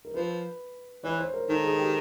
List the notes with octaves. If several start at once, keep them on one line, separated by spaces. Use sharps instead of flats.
A#4
F3 B4
E3 C#5
C5
A#4
D#3 A4
G#4
G4